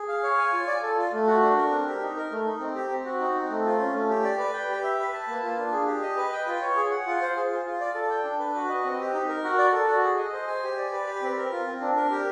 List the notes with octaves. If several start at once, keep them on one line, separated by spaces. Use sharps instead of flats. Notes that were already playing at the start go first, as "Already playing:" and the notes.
Already playing: G#4
F5
C#5
G#5
F4
D5
A4
F4
A3
F#4
D4
A#4
C4
G4
D#4
A#4
A3
D#4
C4
G4
C4
F#4
D#4
C4
A3
F4
C#4
A3
G4
D5
B4
G5
G4
E5
B4
A5
A#3
F4
D4
G#4
G4
D#5
B4
G5
F4
C#5
G#4
F#5
F4
C5
G#4
F4
F4
D5
A4
G5
D4
B4
F#4
D#5
C4
G4
D#4
A#4
F#4
D5
A4
F#4
G#4
D#5
C5
G#5
G4
D5
B4
G4
C4
A#4
F4
C4
D4
A#4
G4